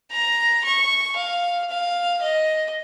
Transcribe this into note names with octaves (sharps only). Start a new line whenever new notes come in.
A#5
C#6
F5
F5
D#5